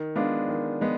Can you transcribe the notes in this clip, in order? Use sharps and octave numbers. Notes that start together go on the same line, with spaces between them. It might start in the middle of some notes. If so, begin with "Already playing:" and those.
Already playing: D#3
G#3 B3 D4 F4
D#3
G#3 B3